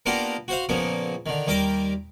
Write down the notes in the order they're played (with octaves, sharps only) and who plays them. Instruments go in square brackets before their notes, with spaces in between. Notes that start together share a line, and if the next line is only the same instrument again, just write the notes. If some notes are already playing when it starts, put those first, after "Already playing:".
[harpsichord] A#3 B3 D4 F4 G4 A#4
F#4 C5 F5
A#2 C#3 F3 A#3 B3
D3 D#3
D#2 G3 A#4 G5 D6